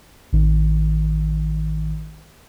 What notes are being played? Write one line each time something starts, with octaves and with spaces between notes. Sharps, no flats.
A1 D#3